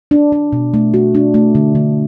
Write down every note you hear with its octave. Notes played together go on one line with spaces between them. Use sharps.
D4
D4
B2
A3
F#4
D4
A3
D3
D3